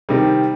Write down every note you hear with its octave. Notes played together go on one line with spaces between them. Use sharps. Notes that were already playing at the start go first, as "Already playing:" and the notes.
C3 D#3 G3 C4